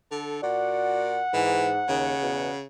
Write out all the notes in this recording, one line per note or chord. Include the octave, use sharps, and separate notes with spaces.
D3 A4
A#2 F#4 D5 F#5
G#2 E3
D#2 C#3
E2 B2